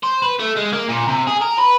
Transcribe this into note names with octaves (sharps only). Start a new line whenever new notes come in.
C5
B4
A3
G#3
A#3
A#2
C3
G#4
A#4
B4